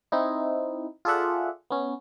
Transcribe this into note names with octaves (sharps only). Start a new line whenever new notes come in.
C4 D#4 E4
F4 G#4 A4 D5 E5 F#5
B3 C#4